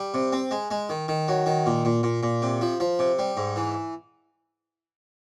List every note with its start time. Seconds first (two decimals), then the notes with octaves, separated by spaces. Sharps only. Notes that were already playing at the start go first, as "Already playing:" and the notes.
Already playing: G3
0.14 C3
0.32 C4
0.51 G#3
0.71 G#3
0.89 D#3
1.08 D#3
1.28 F#3
1.46 D#3
1.66 A#2
1.85 A#2
2.03 A#2
2.23 A#2
2.42 C3
2.61 F3
2.80 F3
2.99 C3
3.19 G3
3.37 G#2
3.56 E3